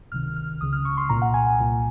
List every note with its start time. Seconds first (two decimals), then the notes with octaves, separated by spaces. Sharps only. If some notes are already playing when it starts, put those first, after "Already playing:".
0.12 C#2 C3 D#3 F6
0.36 F6
0.61 C#2 C#3 D#6
0.73 F6
0.85 C#6
0.97 C6
1.09 C2 A#2 A#5
1.22 F#5
1.34 G#5
1.47 G#5
1.60 C2 A#2